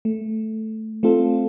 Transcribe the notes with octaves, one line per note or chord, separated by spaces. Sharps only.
A3
A3 C4 F4 A4